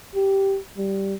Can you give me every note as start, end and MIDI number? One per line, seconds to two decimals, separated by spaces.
0.15 0.58 67
0.77 1.14 55